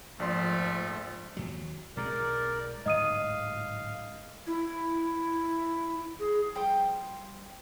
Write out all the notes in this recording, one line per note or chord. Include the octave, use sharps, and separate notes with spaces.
A#1 G#2 F3 A3 D5 C6
D#2 F#3
B1 E2 G#3 A#4 D5
D1 G#2 D#5 F5 D#6 D#7
E4
G#4
F3 G3 C5 G5